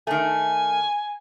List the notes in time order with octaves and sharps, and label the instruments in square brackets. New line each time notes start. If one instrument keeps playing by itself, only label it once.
[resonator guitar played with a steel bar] D#3 A3 [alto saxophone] G#5